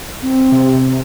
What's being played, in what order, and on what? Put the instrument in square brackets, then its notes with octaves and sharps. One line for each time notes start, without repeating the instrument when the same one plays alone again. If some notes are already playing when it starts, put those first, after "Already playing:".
[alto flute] C4
[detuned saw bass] C3